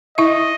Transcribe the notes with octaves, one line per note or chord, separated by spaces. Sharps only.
E4 D#5 E5